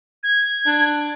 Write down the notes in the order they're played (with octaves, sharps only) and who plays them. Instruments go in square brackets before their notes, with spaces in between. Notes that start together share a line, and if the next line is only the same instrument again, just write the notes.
[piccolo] G#6
[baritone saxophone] D4